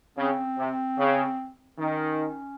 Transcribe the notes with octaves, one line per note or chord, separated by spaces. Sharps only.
C#3 C4
C3
C#3
D#3 C#4